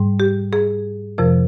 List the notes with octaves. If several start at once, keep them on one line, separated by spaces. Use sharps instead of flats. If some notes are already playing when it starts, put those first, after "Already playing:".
Already playing: G#2 G3
G4
G#4
F2 C3 F3 A#4